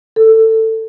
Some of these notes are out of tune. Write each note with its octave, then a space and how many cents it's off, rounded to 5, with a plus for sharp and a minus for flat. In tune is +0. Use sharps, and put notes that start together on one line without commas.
A4 +15